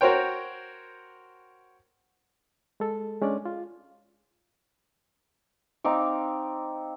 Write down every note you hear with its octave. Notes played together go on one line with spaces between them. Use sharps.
F#4 A#4 C5 C#5 G5
G#3 A4
G#3 C#4 D4 D5
F4
C4 D#4 F5 D6